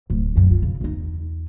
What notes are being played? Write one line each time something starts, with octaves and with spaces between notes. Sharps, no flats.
D1
F#2 A#2
F4
C#3
E2 D#4